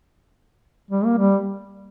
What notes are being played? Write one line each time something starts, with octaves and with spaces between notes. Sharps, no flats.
G3
A#3
G3